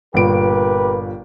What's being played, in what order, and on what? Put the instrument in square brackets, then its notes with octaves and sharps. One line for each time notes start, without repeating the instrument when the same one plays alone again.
[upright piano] G1 A#2 D7 [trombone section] G4 A#4 B4